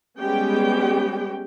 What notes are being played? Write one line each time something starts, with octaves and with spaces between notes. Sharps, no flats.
G3 G#3 B3 C#4 G4 G5